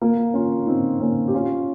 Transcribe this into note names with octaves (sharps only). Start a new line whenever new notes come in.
A#3
C#4 F4
C4 D#4
A#3 C#4
G4
C#4 F4